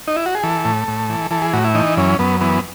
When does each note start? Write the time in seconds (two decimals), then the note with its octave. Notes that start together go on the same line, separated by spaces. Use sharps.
0.08 D#4
0.16 E4
0.26 F#4
0.35 G#4
0.43 E3 A4
0.65 A2
0.88 A2
1.10 E3
1.31 E3 A4
1.42 G#4
1.53 A2 F#4
1.64 E4
1.75 E3 D#4
1.97 F#2 C#4
2.19 F#2 B3
2.41 E3 B3